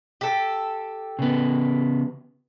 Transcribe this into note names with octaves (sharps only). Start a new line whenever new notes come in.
G4 A4
C#3 B3